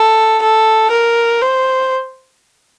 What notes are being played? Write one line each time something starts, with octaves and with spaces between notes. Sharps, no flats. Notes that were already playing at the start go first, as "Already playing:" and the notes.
Already playing: A4
A4
A#4
C5